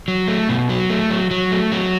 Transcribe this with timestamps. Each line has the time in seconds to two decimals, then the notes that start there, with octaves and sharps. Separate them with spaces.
0.08 F#3
0.28 A3
0.49 B2
0.69 F#3
0.90 A3
1.10 F#3
1.31 F#3
1.52 A3
1.72 F#3